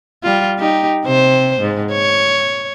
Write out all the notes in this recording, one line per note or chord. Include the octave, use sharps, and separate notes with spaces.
G3 F4
D#4 G4
C3 C5
G#2
C#5